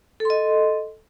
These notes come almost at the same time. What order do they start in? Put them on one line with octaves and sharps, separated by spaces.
A4 C6 D#5